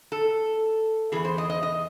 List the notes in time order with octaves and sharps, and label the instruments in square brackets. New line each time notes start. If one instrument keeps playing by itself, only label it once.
[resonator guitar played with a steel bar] A4
E2 C#3 E3 G#4
C5
D#5
D#5
D#5